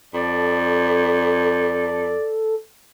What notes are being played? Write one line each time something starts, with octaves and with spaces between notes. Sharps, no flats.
F2 A4 D5